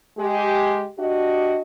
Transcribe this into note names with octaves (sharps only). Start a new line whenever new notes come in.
G#3 G4
D4 F#4 G4 D#5